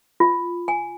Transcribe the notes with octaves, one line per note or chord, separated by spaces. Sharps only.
F4
G#5